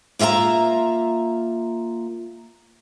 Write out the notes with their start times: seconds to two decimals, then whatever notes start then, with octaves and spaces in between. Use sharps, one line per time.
0.19 A#3 F4 E5 G5 A#5